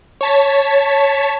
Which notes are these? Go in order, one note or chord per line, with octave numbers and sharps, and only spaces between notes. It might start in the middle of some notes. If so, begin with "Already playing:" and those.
C#5 A5 B6